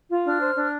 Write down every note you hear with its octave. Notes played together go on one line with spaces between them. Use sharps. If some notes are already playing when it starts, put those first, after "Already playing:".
F4
D4 F6
C5
D4